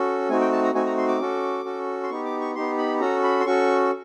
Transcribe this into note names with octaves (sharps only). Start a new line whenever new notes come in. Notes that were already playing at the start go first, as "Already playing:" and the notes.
Already playing: C#4 F#4 A4
A3 C4 D#4 F#4 G#5
G5
A5
A#5
A3 C4 D#4 F#4 G#5
A#5
C6
D6
C#4 F#4 A4
C#4 F#4 A4
C6
B3 D#4 G4 C#6
D6
C#6
B3 D#4 G4 C6
B5
C#4 F#4 A4 A#5
B5
C6
C#4 F#4 A4 C#6